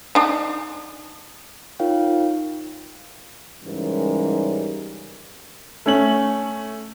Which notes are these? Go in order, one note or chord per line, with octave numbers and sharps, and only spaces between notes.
D4 D#4
D#4 F4 A#4 C#5 F5 G5
G#2 C#3 E3 G3 C#4 A#4
A3 C#4 F#7